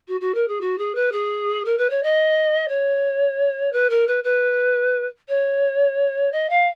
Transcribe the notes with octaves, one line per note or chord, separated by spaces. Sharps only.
F#4
F#4
A#4
G#4
F#4
G#4
B4
G#4
A#4
B4
C#5
D#5
C#5
B4
A#4
B4
B4
C#5
D#5
F5